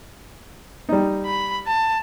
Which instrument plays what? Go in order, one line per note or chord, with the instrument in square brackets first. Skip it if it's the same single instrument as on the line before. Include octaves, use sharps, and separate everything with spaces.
[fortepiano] G3 D#4
[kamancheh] B5
A5